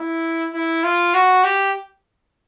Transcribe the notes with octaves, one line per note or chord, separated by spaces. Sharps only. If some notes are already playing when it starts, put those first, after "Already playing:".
Already playing: E4
E4
F4
F#4
G4